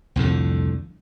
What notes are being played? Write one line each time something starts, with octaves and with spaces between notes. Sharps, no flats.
C2 F2 A2 D3